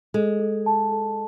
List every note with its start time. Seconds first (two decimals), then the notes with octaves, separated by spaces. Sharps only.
0.14 G#3 A4
0.40 A4
0.66 A5
0.92 A4